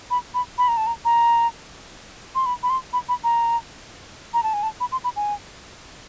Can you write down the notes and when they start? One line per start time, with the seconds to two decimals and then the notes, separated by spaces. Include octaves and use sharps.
0.11 B5
0.34 B5
0.58 B5
0.68 A#5
0.77 A5
0.87 A#5
1.05 A#5
2.35 C6
2.46 B5
2.63 B5
2.70 C6
2.93 B5
3.09 B5
3.24 A#5
4.34 A#5
4.43 A5
4.53 G#5
4.63 A5
4.80 B5
4.92 C6
5.04 B5
5.16 G#5